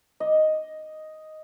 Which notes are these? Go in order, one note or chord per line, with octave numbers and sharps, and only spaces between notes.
D#5